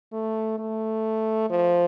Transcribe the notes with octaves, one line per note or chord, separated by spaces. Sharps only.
A3
A3
F3